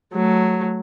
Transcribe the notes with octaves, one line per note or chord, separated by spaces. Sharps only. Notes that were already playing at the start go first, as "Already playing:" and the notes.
F#3 A3